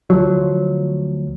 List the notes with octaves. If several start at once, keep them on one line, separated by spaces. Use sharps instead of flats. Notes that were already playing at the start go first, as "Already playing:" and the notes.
D2 F3 F#3